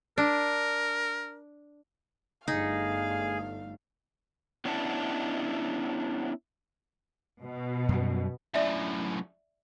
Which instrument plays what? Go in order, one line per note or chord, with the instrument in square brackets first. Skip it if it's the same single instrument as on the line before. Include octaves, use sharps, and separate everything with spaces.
[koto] D4 [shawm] A#4
[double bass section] G1 G2 A3 [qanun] D#4 [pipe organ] G#4 [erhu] F5
[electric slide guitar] B3 C#4 D4 E4 F#5 A5
[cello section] B2
[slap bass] F#2 G3
[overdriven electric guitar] F#2 A2 [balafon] D5 E5